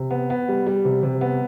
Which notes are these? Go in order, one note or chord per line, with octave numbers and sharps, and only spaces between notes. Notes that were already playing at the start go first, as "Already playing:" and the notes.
Already playing: C3
B3
B3
G3
G3
C3
C3
B3